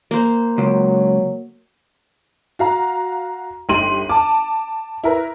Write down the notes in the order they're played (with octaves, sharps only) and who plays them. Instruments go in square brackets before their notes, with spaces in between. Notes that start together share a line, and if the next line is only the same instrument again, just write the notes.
[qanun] A#3 C5
[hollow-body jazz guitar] C#2 [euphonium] F#3
[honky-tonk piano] F#4 F5 A#5
G1 D#4 G4 C6 D#7 F#7
A5 D6
E4 A#4 B4